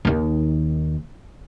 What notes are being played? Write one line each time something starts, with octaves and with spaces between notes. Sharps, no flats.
D#2 D#3